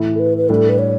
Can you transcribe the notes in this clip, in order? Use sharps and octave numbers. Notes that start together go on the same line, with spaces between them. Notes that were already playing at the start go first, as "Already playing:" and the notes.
Already playing: A2 E3 A3 E4
A4
B4
B4
A2 G3 D4 A4
B4
C#5